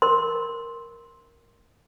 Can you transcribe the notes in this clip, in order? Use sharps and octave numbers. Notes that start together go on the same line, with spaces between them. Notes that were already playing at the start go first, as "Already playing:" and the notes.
A#4 C6